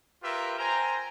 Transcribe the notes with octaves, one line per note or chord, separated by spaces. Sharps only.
F4 G4 A#4 B4 E5
C5 G5 G#5 A#5